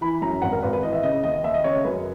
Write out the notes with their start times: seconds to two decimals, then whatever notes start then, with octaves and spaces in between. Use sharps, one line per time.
0.01 E3 B5
0.22 F#2 A#5
0.42 G#1 F#5
0.52 A#4
0.62 G#1 B4
0.73 B4
0.83 E3 D#5
0.93 E5
1.03 C#3 D#5
1.24 D#2 D#5
1.34 D#5
1.43 D#2 E5
1.54 D#5
1.64 C#3 C#5
1.84 F#2 B4